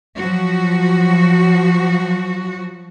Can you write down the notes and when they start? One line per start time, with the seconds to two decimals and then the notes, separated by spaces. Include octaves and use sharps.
0.17 F3 F#3 F#4